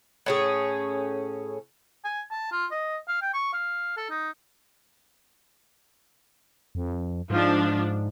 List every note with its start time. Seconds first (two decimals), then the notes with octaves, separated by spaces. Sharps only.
0.26 A2 C#4 G#4
2.04 G#5
2.31 A5
2.52 F4
2.72 D#5
3.08 F5
3.22 G5
3.34 C#6
3.54 F5
3.97 A4
4.10 D#4
6.75 F2
7.30 G#2 F3 D4